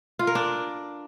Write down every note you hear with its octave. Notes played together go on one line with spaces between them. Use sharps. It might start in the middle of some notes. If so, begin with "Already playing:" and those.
F4
A#4
D4